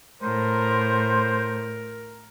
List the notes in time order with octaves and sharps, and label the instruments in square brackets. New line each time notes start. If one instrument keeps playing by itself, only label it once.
[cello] A2 [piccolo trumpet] A#4 [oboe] C5